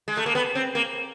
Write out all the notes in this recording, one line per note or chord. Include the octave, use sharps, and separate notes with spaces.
G#3
A3
A#3
B3
C4
A#3